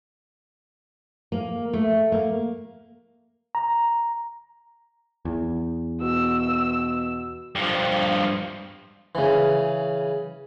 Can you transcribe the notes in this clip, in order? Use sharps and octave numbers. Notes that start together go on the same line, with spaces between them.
A#3
A3
A#3
A#5
E2
B2 E6
G2 F3
C#3 E3